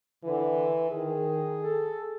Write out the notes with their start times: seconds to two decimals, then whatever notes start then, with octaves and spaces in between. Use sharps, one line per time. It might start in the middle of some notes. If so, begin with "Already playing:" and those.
0.24 D3 E3
0.91 D#3 G#4
1.63 A4